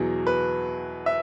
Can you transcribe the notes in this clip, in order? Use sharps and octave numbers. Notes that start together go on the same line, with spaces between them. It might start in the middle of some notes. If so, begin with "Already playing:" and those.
Already playing: E2 B2 F#3 E4 G#4
B4
E5